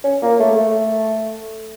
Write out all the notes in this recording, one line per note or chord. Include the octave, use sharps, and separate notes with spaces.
C#4
A#3
A3
A3